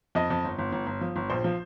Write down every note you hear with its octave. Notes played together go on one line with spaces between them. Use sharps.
F2 D#5
F2
G1
G1
G1
G1
F3
G1
A#1 C5
F3